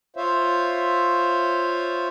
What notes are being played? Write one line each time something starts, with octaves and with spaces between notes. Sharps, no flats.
F4 C5 C#5 E5 F5